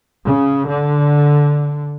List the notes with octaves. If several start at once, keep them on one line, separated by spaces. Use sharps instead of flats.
C#3
D3